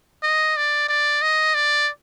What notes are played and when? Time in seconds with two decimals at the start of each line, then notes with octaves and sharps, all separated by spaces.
0.23 D#5
0.57 D5
0.89 D5
1.22 D#5
1.55 D5